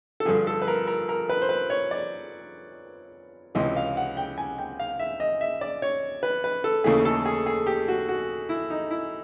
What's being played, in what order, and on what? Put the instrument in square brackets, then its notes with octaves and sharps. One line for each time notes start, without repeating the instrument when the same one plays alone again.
[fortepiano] A4
G2 D3 F3 G#4
A4
B4
A#4
A#4
A#4
B4
C5
B4
C#5
D5
C#2 C3 E3 D#5
F5
F#5
G5
G#5
G5
F5
E5
D#5
E5
D5
C#5
B4
B4
A4
D#2 C#3 E3 A3 G#4
A4
G#4
G#4
G4
F#4
F#4
E4
D#4
E4